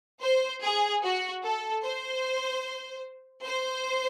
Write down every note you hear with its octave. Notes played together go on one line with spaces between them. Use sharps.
C5
G#4
F#4
A4
C5
C5